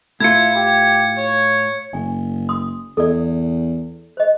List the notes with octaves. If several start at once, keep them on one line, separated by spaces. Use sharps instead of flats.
A2 E4 F4 G#6 C#7
G4
C#5
F#1 G#5
C6 D#6
E2 A4 D5
C5 D#5